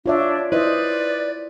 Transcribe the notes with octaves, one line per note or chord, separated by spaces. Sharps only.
D4 F4 C#5 E5
E4 B4 C5 D5 D#5